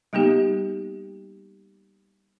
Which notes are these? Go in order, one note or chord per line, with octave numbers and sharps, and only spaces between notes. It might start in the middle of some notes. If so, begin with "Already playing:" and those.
G3 A#3 B3 D#4 G4